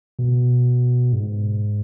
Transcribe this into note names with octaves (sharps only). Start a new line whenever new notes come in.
B2
G#2